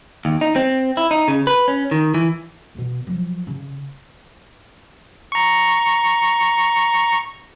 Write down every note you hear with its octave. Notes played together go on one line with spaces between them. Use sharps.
D#2
D#4
C4
E4
D#4
C#3
B4
C#4
D#3
E3
E2 B2
F3 F#3
C#3
A#5 C#6